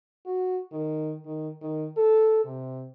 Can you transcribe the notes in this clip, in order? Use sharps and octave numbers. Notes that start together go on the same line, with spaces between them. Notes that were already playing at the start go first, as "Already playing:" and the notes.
F#4
D#3
D#3
D#3
A4
C3